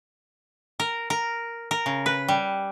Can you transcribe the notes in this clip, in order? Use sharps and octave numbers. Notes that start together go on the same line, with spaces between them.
A#4
A#4
A#4
C#3
B4
G3